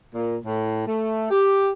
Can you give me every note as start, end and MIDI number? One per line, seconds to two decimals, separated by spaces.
0.14 0.38 46
0.45 0.85 45
0.86 1.30 57
1.31 1.71 67